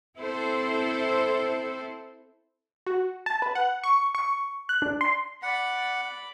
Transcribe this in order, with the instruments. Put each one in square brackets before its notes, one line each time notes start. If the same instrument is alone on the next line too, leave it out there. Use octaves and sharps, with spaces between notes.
[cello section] C4 E4 A4 C5
[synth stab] F#4
A5
B4
F#5
C#6
C#6
F#6
D4
C6
[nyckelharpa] D5 B5 [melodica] F#5